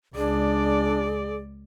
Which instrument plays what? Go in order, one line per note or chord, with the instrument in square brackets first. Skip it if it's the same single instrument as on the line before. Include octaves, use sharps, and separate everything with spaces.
[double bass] C#2 [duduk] D4 [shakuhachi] G#4 [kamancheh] D5